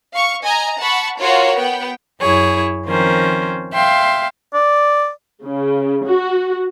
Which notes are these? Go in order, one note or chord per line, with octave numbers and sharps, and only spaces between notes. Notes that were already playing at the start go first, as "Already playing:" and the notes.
F5 C#6
D#5 G#5 A#5
F#5 A5 B5 C#6
F4 F#4 A#4 C#5 F5
B3 G5
F#2 E4 G#4 C#5
D#3 F3 C4 C#4 A#4 C5
E5 F5 G5 C6
D5
C#3
F#4